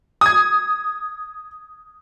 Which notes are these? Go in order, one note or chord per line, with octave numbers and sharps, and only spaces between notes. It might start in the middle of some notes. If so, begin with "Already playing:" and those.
D#6 G#6